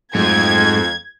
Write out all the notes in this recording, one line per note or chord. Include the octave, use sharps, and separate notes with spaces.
F2 G#2 F#3 A3 G#6